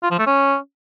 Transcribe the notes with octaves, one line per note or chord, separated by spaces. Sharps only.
F4
F3
A3
C#4